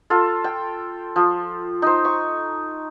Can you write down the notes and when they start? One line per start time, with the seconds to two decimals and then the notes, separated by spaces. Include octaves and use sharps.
0.10 F4 A4
0.44 G5
1.16 F3
1.82 D#4 C5
2.05 C#6